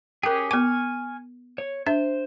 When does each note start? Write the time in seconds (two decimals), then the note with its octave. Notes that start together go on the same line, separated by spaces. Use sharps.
0.23 C#4 G4 G#4 A#4 G5
0.51 B3 G#5 C#6 D6 F6
1.58 C#5
1.87 D4 C5 E5